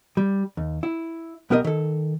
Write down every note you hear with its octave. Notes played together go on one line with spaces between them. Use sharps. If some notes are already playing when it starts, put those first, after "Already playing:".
G3
D#2
E4
B1 B3 G4 A#4 B4 D#5
D#3 A4